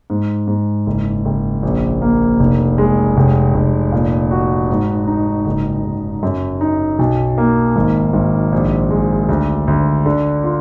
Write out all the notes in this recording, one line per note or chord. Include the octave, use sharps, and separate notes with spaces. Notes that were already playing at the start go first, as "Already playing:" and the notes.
G#2
G#2
F#1
F#1
A#1
A#3
F1
G#3
F1
F1
A#2
F#4
G#2
D#4
F#1
F#1
F#2
D#4
B1
A#3
G#1
G#1
A#1
G#3
D2
D2
D3
F4